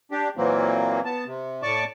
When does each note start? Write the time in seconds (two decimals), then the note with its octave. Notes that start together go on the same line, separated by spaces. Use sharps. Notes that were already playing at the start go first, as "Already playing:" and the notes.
0.11 D4 G4
0.37 A#2 E3 F#3 A#3 C4
1.05 B3 A5
1.27 C3
1.63 A2 D5 A5 C#6 D6